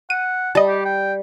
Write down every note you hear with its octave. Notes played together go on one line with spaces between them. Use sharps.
F#5 D#7
G3 D#5 A5
G4
G5